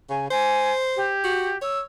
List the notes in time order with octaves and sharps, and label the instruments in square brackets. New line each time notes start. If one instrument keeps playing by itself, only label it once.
[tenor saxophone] C#3 [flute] G#5
[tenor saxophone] C5 [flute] G#5
[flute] G4
[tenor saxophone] F#4
[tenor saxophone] C#5 [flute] E6